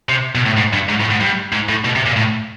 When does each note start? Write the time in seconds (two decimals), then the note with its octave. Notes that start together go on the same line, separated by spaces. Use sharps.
0.09 C3
0.35 B2
0.46 A2
0.57 G#2
0.73 G2
0.89 G#2
1.00 A2
1.10 G#2
1.20 G2
1.52 G#2
1.69 A2
1.85 B2
1.95 C3
2.06 A#2
2.16 A2